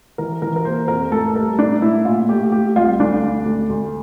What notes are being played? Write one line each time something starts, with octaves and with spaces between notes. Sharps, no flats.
E3 A#4
E3 A#4
A#4
A#3 C5
F2 A#4
A2 A4
G3 A#4
A2 D4
A2 E4
A#2 F4
A3 G4
A3 G4
C2 F4
D2 D4
D2
D2
D2